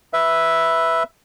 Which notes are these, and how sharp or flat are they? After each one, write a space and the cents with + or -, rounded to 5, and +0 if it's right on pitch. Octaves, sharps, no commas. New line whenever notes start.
B4 +0 E5 +0